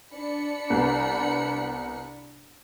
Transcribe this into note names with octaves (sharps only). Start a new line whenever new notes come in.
D4 B5 C#7
C2 B3